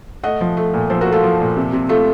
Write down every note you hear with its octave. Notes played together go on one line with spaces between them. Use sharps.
A3 D#5 F#5
F3
A3
A#2
F3 A4 C5
F#4 A#4
A3
F4 A4
F3
A#2
C3
C3
A3 F4 A4